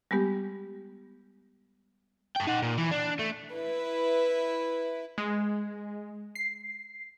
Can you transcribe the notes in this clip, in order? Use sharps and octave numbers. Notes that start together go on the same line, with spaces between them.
G3 G#3 B3 G4
A4 G5
D#4 F#5
A#2
E3
D4
A3
E4 B4
G#3
C7